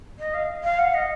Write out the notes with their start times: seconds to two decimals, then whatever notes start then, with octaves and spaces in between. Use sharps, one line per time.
0.19 D#5
0.34 F5
0.64 F5
0.79 F#5
0.94 D#5